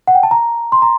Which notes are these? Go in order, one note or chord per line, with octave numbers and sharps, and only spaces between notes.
F#5
G5
A5
A#5
C6
A#5